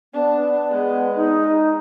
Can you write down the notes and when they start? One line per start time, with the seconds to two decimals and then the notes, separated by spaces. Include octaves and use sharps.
0.13 B3 D4
0.70 G#3
1.15 D#4